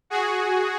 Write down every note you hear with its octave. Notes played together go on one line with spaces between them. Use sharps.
F#4 G#4